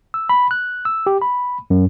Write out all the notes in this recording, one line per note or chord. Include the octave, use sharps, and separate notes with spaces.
E6
B5
F#6
E6
G4
B5
F#2